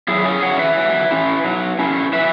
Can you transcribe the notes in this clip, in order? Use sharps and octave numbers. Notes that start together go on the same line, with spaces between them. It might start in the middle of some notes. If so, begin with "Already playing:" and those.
F#3 E4 G#4
G#4 C#5
C#4 E4 C#5 F#5
B4 E5
F#3
C#4 E4
F#3
C#4 E4
F#3 B4 E5